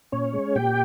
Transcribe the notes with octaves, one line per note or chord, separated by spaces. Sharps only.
A#2 C#4 C#5
G#3
A#2 G4 G5